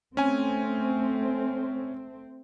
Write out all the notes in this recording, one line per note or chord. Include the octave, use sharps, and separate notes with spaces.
A3 C4 C#4 G#5